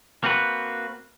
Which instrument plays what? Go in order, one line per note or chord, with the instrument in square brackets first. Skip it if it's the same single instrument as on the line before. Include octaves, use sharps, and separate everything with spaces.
[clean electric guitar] A#3 C4 F#4 B4